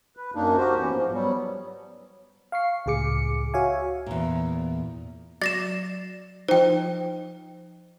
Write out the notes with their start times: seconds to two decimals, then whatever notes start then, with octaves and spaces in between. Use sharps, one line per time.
0.17 B4
0.35 F#2 A#3 D4 D#4
0.58 F#4 G4 A#4 C5
0.78 E3 B3 C#4
0.90 G#2 F3
1.12 F#3 G3 B3
2.52 F5 C#6 C7
2.86 C#2 A2 G#4 D6 C#7
3.54 F#4 C#5 E5 F5 G#5
4.06 E2 A#2
5.42 F#3 D5 A6 A#6 C7 E7
6.48 F3 D#4 C5 G5